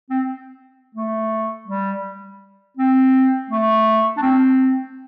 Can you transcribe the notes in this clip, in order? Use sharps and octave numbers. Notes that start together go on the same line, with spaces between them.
C4
A3
G3
C4
A3
D4
C4